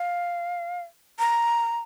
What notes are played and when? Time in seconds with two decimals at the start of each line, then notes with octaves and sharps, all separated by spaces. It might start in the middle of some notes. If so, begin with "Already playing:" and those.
Already playing: F5
1.19 A#5